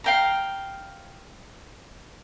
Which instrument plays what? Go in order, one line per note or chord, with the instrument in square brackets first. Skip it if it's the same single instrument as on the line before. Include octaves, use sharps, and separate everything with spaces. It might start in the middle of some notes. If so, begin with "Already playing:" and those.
[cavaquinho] F5 G5 A#5